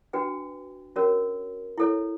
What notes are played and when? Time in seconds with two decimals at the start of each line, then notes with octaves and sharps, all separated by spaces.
0.13 D4 F#4 B4 G5
0.96 C#4 F#4 A#4 C#5
1.78 E4 A4 C#5